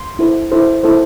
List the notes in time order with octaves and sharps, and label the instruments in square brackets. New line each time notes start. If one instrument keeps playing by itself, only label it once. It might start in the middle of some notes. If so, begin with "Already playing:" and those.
Already playing: [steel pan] C6
E4 A4 C5
E4 A4 C5
E4 A4 C5